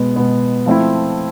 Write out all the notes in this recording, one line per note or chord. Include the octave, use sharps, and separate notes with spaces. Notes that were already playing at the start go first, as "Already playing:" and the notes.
Already playing: B2 G#3 B3
B2 G#3 B3
F3 A3 C4 E4